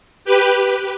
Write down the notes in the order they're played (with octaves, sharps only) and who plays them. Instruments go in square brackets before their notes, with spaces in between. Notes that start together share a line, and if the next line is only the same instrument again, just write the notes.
[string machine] G4 B4